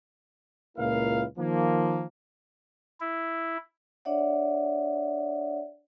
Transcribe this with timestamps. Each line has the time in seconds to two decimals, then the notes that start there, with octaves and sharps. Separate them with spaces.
0.77 C#2 A#2 A#3 E4 A#4 F5
1.38 D#3 F3 A#3
3.01 E4
4.05 D4 C#5 D5 E5 F#5